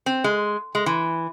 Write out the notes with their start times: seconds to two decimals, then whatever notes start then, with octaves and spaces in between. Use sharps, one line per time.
0.06 C4
0.24 G#3
0.75 G#3
0.86 E3